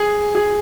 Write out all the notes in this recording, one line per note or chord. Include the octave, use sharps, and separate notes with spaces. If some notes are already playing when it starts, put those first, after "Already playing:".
Already playing: G#4
G#4